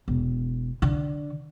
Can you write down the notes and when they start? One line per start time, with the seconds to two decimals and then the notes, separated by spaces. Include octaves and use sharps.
0.08 E1
0.82 D3